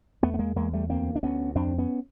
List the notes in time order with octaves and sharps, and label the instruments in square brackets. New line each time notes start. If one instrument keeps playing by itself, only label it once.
[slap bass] E2 A3 B3
B3
G#3 A#3
E2 G#3 A#3
G3 A3
D2 A#3 C4
D4
D2 B3 C#4
F2 C4 D4
B3 C#4